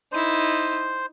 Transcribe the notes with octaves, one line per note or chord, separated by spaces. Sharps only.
D#4 E4 C5